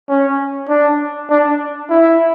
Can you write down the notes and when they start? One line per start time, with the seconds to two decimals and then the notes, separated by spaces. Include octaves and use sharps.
0.09 C#4
0.69 D4
1.30 D4
1.90 E4